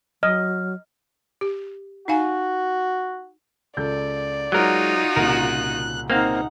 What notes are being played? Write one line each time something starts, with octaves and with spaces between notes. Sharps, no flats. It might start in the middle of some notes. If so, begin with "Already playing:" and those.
F#3 D#5 F6
G4
D#4 F#4 F5 G#5
C#2 A4 D5 G6
F#3 G#3 D#4 F4 F#4 A#4 G#6 G7
C2 A#2 C#3 A#4 F#6
A#3 C4 D#4 F5 F#5